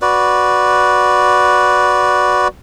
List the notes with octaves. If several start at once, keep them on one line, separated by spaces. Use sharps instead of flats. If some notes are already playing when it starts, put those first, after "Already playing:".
F#4 B4 D5